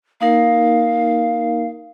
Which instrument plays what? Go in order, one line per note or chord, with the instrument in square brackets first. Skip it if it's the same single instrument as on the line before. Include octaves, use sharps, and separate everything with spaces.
[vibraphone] A#3 D#4 A#4 [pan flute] F5